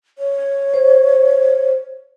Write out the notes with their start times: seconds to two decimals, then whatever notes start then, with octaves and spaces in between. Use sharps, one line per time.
0.18 C#5
0.74 C5